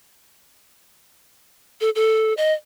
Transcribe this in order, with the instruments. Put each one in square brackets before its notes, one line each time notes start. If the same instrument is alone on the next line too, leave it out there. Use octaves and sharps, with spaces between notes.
[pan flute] A4
A4
D#5